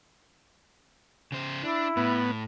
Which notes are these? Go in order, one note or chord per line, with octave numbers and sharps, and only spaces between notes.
C#3 C5
D4 E4
A2 B3